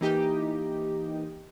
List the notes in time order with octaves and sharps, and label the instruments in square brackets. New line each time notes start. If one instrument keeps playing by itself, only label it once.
[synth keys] E3 A#3 D#4 G4 D#5